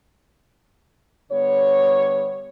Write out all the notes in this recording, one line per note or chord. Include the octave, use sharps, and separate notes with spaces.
D3 G3 B3 C#5